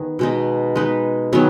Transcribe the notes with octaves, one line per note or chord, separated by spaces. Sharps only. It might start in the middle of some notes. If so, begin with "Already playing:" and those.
Already playing: D#3 B3 G#4
B2 G#3 D#4
G#3 D#4 B4
D#3 F#3 B3 G#4